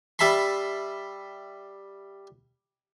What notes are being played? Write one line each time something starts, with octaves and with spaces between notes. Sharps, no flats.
G3 E5 A5 B5 C6